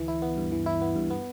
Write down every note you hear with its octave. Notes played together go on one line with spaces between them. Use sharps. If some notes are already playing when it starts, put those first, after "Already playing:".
Already playing: D2 E3
E4
B3
G2
E3
E4
B3
G2
B3